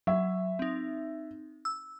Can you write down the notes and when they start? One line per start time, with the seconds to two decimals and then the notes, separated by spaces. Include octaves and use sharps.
0.07 F#3 E5
0.59 C4 D#4
1.65 E6